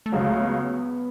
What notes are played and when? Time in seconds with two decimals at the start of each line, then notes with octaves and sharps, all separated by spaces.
0.06 A3
0.12 C#2 C#3 F#3 G#3
0.27 A3
0.40 B3